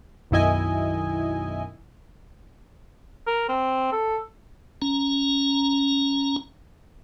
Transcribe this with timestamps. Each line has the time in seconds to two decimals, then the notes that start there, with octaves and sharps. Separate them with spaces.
0.31 B1 F#2 D#3 E4 D#5 G#5
3.27 A#4
3.49 C4
3.92 A4
4.82 C#4 A#5